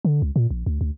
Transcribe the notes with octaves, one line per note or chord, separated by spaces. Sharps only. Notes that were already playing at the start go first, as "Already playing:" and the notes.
D3
C#2
A#2
A#1
D2
D2